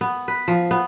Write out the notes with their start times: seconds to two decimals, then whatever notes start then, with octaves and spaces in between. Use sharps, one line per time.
0.01 B3
0.28 B4
0.48 F3
0.71 B3